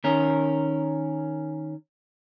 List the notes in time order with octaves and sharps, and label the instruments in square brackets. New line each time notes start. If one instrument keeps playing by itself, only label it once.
[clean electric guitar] D#3 C#4 A#4